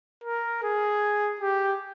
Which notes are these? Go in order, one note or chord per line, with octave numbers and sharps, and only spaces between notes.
A#4
G#4
G4